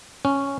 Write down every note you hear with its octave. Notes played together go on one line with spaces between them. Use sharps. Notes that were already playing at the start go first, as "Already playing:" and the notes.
C#4